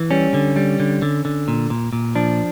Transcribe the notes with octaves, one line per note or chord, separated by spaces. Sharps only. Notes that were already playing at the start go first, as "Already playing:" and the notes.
Already playing: E3
G3 C#4
D3
G3
D3
D3
D3
A#2
A#2
A#2
F3 D4